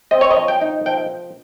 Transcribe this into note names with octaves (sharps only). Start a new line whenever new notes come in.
C4 D#5
C#5
D#5
F3
G5
D#4
F3 G5